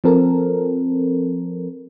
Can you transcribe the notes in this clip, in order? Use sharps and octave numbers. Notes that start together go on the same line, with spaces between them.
F3 C4 A4 A#4